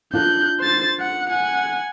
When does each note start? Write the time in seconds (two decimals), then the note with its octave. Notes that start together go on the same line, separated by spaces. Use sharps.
0.13 D4 F4 A#4 F#6 G6
0.60 C5 A6
1.00 F#5
1.30 F#5 G#5